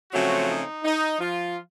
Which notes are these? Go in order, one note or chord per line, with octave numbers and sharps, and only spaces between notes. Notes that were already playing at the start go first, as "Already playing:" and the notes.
C#3 F3 F#3 A3 C4 F#4
D#4
D#4
F3 F4